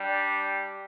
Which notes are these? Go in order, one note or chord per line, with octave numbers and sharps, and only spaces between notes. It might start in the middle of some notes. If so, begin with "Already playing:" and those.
Already playing: G3 D4 G4